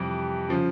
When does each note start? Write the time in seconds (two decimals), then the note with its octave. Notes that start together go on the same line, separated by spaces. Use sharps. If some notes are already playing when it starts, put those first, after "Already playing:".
Already playing: F2 C3 E3 G3
0.49 C#3 F3